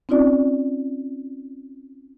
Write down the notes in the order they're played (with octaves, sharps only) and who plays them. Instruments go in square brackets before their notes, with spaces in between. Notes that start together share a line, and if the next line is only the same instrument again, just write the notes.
[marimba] C4 C#4 D#4 F4 D5